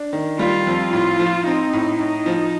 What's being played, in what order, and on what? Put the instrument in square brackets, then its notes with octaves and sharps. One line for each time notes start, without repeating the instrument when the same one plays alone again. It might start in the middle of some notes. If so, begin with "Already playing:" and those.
Already playing: [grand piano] D4
D#3
[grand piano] G3 [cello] F4
[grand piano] F2
[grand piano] A2 [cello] F4
[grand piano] F3
[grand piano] C4 [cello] D#4
[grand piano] A2
[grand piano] A2 [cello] D#4
[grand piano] F3